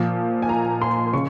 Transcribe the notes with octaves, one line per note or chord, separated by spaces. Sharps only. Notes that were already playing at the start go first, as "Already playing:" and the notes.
Already playing: A#2 F3
G#5
A#5
C6
C#3 C#6